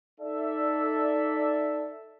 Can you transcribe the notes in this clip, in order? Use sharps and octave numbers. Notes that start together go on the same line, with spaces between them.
D#4 A4 D5 E5